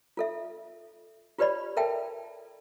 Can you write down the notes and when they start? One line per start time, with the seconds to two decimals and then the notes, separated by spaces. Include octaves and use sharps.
0.17 F4 A4 E5
1.38 F4 G4 B4 C#5 D5 B5
1.77 A4 A#4 E5 G5 A5